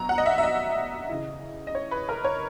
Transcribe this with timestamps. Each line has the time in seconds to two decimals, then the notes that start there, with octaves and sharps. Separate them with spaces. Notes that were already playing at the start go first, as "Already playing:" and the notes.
Already playing: B2 F#3 A#5
0.09 F#5
0.18 D#5
0.26 E5
0.38 E5
0.43 D#5
1.09 C#3 E3
1.67 D#5
1.75 C#5
1.91 B4
2.09 A#4
2.25 C#5